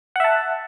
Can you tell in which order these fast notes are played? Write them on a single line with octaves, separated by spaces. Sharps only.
F#5 E5 A5